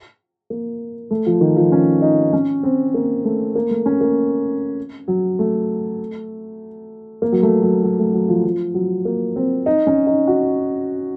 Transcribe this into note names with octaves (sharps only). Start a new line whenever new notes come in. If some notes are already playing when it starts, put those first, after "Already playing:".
A#3
A3
F3
D#3
F3
C#4
D#4
C#4
C4
A#3
A3
A#3
A3
C#4
A#3
F#3
A3
A#3
F#3
A3
F#3
F#3
A3
F#3
F3
F3
F#3
A#3
C4
D#4
C#4
D#4
F#4